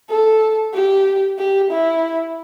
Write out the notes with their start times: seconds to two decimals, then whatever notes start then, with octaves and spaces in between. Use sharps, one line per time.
0.09 A4
0.74 G4
1.38 G4
1.71 E4